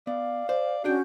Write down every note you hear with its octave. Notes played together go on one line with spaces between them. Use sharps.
B3 D5 F5
C5 D5
C#4 D4 F#4 G#4 F#5 G5 G6